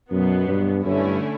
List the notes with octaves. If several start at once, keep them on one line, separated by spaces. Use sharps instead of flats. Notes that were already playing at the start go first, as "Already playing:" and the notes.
F#2 B2 F#3 B3
G2
G2 D3 A3 C#4 E4